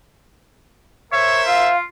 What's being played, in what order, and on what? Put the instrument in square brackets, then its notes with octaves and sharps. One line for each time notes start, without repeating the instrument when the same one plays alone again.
[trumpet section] A#4 C5 E5 [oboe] C#5
[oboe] F4 [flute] F5